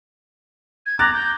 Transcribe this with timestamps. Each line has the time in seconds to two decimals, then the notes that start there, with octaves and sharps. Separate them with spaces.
0.86 G#6
0.99 A#5 D6 F#6 A6
1.14 G6